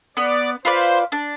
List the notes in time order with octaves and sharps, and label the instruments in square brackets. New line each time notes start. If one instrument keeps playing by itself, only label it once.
[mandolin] B3 [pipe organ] D5
[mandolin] F4 B4 D5 [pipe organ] C5
[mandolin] D4